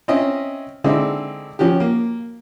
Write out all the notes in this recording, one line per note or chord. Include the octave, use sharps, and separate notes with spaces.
C4 C#4 D#5 E5
D3 G#3 C4 D#4 E4
F3 C#4 F#4 G4
A#3